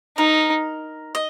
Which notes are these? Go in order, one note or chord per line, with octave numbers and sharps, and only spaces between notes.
D#4 A#4
D#5